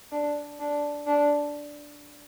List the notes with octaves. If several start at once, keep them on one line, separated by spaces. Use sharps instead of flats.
D4
D4
D4